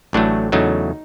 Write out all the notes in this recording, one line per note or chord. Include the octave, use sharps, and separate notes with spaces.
A1 A2 F#3 A3 D4
E2 C#3 F#3 A3 D#4